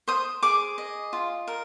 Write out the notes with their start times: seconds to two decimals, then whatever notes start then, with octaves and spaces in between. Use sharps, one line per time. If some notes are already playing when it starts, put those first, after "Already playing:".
0.08 C5 D#6
0.43 G#4 D6
0.78 D#5
1.13 F4
1.48 A#4